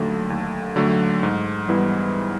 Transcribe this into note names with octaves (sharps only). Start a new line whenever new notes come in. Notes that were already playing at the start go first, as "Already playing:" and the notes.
Already playing: D#2 D3 F#3 A3
D#2
D3 F#3 A3
G#2
E3 G3 B3 E4